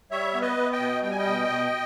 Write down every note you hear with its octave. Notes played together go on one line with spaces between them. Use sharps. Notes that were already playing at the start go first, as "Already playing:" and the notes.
G3 C#5 E5
B3
B4 D#5
B3
D#5 G5
B2
G3 G5
G#5
D#5 G5
B2
B2